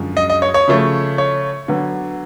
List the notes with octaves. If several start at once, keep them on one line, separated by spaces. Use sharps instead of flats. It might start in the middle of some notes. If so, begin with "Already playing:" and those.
Already playing: F#2 D3 F3 G#3
D#5
D#5
C#5
C#5
C#3 F3 A3
C#5
D3 F#3 B3